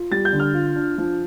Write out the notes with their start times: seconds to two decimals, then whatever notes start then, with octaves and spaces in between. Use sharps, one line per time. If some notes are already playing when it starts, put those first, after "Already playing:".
Already playing: F4
0.11 G3 A6
0.25 G6
0.33 D3
0.39 F6
0.54 F4
0.76 D4
0.98 F3